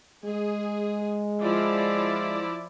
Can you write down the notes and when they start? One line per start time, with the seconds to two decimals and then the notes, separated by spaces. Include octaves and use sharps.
0.25 G#3 G#4
1.42 F3 E4 D5